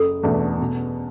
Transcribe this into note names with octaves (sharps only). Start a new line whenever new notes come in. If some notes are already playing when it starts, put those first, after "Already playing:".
Already playing: F#1 A4
E2 B2 A3 D4
B2